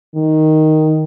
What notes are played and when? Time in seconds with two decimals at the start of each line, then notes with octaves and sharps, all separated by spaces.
0.15 D#3